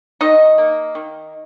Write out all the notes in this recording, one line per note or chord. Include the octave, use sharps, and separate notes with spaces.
D#3 D#4 D#5
A#3
D#3